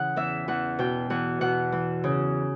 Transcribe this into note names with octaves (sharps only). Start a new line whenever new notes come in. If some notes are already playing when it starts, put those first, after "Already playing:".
Already playing: C#3 E3 F#5
E2 E5
E2 F#5
B2 G5
E2 F#5
B2 F#5
E3
C#3